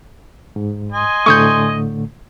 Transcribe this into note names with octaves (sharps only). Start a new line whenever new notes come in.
G#2
D#5 G#5 C6
A2 D3 A3 C#6 D#6 G6